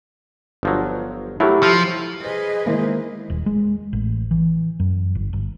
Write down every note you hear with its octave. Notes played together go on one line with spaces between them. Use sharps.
G1 F3 F#3
F#3 A3 E4 G4 A#4
F3 A4
G#4 B4 C5 D#5
D#3 G#3 A#3 E4 C5
D#1
G#3
A1
E3
F#2
G1
G1